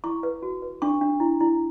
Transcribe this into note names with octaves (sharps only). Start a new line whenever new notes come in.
E4 C#6
B4
F#4
B4
D4 C#6
D4
E4
E4